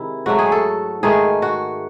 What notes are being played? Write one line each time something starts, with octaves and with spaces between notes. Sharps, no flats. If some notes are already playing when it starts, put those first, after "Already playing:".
Already playing: C3 D#3 G#3 E4
G#2 F#3 A3 F#4
G#4
A4
G#2 D#3 A3 G#4
F#4